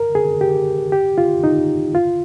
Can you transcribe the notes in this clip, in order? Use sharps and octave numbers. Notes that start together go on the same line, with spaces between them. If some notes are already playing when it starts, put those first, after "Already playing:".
Already playing: A#4
G#4
G4
G4
F4
D#4
F4